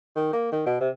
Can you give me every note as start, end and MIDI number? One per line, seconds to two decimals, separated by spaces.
0.16 0.29 51
0.33 0.48 58
0.52 0.62 51
0.66 0.77 47
0.81 0.89 48